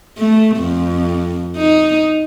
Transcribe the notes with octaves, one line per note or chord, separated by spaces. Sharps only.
A3
F2
D#4